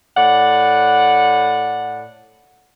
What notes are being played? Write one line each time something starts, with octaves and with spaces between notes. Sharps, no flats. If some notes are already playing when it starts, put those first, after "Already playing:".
A2 D5 F#5